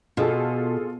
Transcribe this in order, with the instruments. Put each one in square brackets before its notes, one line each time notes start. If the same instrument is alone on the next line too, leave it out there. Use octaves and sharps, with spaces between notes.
[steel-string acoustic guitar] B2 [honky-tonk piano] F4 G#4 A4